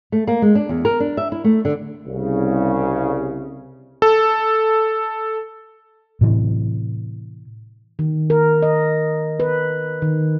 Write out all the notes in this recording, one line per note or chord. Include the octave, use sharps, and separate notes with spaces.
A3
A#3
G#3
D4
E2
A#4
D4
E5
E4
A3
D3
C2 C#3
A4
A2 C3 E3
D#3
A#4
D#5
B4
D#3